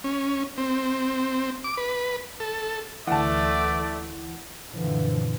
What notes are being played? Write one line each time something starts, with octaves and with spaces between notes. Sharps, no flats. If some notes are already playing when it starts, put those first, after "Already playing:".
C#4
C4
D6
B4
A4
D2 E3 A3 D5 F#5 A5
F#2 A#2 D3 E3 F3